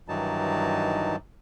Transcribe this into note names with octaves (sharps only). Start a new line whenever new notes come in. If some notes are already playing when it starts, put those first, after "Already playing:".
G2 D#3 E3 F#3 D#4 A5